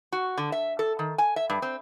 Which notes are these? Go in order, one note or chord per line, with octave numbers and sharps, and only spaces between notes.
F#4
D3
E5
A4
D#3
G#5
E5
G2
C4